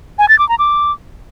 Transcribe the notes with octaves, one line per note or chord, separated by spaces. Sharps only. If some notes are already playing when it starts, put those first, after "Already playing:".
G#5
A6
D6
A#5
D6